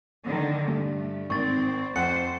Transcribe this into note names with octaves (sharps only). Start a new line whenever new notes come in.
D3 D#3
G2 A3
G#1 C4 C#6 A6
F2 C5 F#5 F#6 C#7